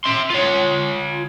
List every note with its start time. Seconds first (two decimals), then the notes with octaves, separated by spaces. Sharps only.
0.04 E5 C6
0.30 F4 C#5